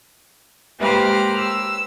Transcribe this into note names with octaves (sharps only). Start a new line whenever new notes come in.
G#3 A#3 G4 B4 C5 F6
E6